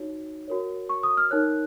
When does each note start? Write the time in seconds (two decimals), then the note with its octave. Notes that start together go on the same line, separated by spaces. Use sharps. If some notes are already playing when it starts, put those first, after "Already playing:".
Already playing: D#4 F#4 C#5
0.48 F#4 A#4 C#5
0.89 C#6
1.03 D#6
1.17 F6
1.31 D#4 A#4 C#5 F#6